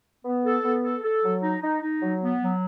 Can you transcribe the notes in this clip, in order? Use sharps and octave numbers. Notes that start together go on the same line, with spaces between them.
B3
A4
B3
A4
A4
F#3
D#4
D#4
D#4
F#3
B3
F#3